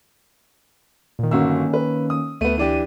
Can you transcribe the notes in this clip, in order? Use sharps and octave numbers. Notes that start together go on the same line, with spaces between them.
A#2 D#3
G1 D#3 A#3 C#4 F#4 E6
B4
D#6
D2 A3 B3 D#7
E3 D4 G4